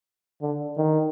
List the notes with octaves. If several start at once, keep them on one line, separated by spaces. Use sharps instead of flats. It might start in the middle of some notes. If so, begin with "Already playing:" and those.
D3
D#3